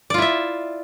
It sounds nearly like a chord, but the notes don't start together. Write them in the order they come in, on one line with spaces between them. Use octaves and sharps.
D5 F4 E4 E5